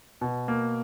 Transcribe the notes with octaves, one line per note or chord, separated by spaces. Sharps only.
B2
A#3